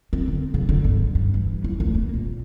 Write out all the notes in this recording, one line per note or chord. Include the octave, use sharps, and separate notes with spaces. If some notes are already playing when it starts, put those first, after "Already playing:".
C4
D3
C#3
D3
G2
F#2
G2
E3
E2
D2
A#3
A#1